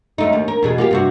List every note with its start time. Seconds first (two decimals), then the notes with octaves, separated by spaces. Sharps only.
0.18 F#2 A3 D#4
0.33 D#2
0.48 A#4
0.62 E2 B2 G#4
0.78 A#3 F4 G4
0.91 G2 C3 F#4